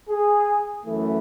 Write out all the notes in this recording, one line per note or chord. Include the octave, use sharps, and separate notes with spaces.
G#4
F#2 E3 A3